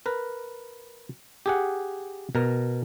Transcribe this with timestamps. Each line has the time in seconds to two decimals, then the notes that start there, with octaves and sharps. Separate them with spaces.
0.06 A#4 B4
1.46 G4 G#4 F#5
2.35 B2 A#4